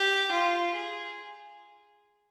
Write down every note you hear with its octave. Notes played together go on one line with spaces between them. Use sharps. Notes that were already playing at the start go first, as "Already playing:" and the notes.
Already playing: G4
F4
G#4